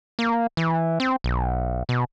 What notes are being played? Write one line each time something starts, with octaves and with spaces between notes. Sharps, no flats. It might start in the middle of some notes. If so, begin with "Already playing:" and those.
A#3
E3
C4
B1
B2